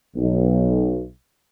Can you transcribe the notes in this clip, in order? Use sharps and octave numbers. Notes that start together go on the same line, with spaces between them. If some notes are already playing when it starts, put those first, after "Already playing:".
B1